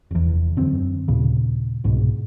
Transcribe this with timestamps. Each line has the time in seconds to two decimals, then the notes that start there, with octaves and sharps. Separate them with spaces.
0.11 F1 E2
0.57 F#2 D3 C4
1.08 D#2 A#2 C#3
1.84 C2 G#2 B2